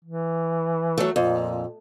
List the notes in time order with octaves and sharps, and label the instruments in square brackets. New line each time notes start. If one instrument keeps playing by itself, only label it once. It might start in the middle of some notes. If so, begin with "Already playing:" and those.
[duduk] E3
[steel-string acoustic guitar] F#3 A3
[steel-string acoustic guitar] F2 [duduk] A#2